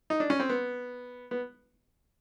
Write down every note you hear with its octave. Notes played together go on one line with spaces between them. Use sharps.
D#4
D4
C#4
C4
B3
B3